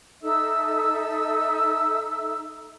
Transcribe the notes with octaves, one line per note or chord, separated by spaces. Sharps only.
D#4 A4 E5 E6